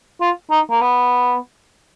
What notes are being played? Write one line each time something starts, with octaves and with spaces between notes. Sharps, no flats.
F4
D#4
A#3
B3